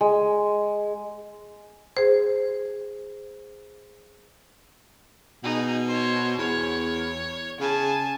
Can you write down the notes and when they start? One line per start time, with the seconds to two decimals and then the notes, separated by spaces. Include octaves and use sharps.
0.01 G#3
1.97 G#4 C5
5.44 B2 D#4 G#4
5.87 C5 C#5
6.38 E2 C#5
7.60 C#3 G#5 A5